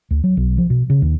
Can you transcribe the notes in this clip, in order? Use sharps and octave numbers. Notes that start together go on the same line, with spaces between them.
D2
F#3
B1
F3
B2
C#3
D#2